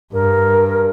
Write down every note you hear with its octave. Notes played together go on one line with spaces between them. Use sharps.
G2 A#4